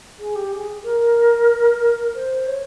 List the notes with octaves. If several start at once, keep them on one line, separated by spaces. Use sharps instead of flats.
G#4
G4
G#4
A#4
C5
C#5